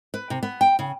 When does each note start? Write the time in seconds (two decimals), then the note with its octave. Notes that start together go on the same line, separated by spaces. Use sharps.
0.14 B4
0.30 C3
0.43 B3
0.61 G5
0.79 C#3